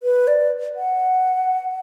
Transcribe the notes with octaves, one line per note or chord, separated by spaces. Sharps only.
B4
D5
F#5